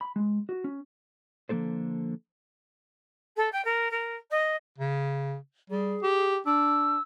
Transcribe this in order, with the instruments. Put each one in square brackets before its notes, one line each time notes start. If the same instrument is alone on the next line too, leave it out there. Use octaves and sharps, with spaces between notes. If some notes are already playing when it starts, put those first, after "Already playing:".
[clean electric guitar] B5
G#3
F#4
C#4
D3 F3 A#3 C4 A4 C5
[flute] A4
G5
A#4
A#4
D#5
[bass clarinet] C#3
[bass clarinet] G3 [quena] G#4
[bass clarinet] G4
[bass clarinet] D4 [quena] E6